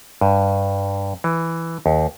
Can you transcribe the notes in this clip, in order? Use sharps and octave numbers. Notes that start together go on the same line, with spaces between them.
G2
E3
D#2